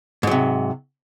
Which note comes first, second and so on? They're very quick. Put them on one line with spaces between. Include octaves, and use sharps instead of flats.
G#2 F#3 C3